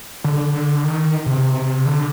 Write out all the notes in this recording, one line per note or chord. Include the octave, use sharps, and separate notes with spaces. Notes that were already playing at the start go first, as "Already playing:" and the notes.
D3
D#3
C3
D3